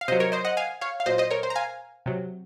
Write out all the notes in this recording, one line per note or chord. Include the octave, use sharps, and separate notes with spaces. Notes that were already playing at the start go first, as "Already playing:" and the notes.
F5
C3 F#3 C5 D#5
A#4 C#5
C5 D#5
D#5 F#5
F5 G#5
C#5 F5
F5
A#2 F#3 C5 D#5
C5 D#5
A#4 C#5
C5
A#5
F5 G#5
C3 F#3